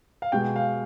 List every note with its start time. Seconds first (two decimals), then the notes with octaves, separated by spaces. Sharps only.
0.22 F5
0.32 B2 G#3 G5
0.56 F5